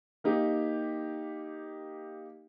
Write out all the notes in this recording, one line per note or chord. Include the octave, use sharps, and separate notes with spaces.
A#3 D#4 G4